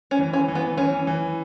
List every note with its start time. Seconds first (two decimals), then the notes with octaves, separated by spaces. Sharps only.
0.11 C#4
0.19 E3
0.33 C#4
0.48 E3
0.55 B3
0.77 E3 C#4
1.07 E3